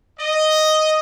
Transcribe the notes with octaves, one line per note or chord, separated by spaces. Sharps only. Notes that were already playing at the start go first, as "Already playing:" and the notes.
D#5